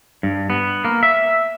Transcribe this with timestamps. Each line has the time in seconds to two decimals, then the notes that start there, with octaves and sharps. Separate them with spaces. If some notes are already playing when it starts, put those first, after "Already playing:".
0.23 G2
0.50 B3
0.85 A#3
1.03 E5